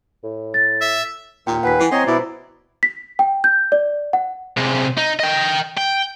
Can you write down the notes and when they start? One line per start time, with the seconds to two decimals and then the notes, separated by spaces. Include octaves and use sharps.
0.24 A2
0.54 A6
0.81 E5
1.47 D#2 A#2 G5
1.63 D#2 B4 F#5 G#5 B6
1.80 E3 C7
1.92 C4 C5 C#5 D#5 A#5 C6
2.07 B2 E4 D5
2.83 B6
3.19 G5
3.44 G6
3.72 D5
4.13 F#5
4.57 C3 G#3
4.97 D#4
5.20 D#5 G5
5.78 G5